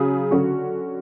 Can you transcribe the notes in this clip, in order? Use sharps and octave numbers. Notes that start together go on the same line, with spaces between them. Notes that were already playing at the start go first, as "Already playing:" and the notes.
Already playing: C#3 F#3 G#4
D3 F#3 C#4 F#4